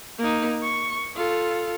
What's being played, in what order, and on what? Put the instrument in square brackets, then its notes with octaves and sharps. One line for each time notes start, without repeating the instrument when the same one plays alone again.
[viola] A#3 D#4
C#6
F4 A4